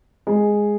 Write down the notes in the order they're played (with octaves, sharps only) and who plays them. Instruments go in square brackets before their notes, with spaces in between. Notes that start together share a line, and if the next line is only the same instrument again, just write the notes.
[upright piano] G#3